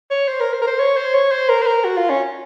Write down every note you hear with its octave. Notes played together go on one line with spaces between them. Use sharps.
C#5
C5
A#4
C5
A#4
C5
C#5
C5
C#5
C5
A#4
C5
A#4
F#4
F4
C#4